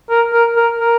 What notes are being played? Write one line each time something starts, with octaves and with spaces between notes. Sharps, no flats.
A#4
A#4
A#4
A#4